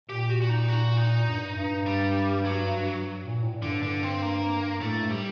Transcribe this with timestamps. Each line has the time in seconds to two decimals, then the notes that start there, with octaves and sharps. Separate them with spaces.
0.09 A#2 G4
0.30 F#4
0.42 F#4
0.49 D#4
0.68 F#4
0.97 D#4
1.28 G2
1.56 G2
1.86 G3
2.45 F#3
3.24 A#2
3.43 A2
3.62 G2 D3
3.83 D3
4.03 C4
4.22 A#3
4.81 A2 A3
5.01 G2
5.11 G3